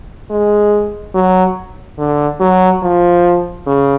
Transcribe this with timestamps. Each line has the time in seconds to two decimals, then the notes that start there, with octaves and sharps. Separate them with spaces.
0.31 G#3
1.15 F#3
1.99 D3
2.40 F#3
2.82 F3
3.67 C#3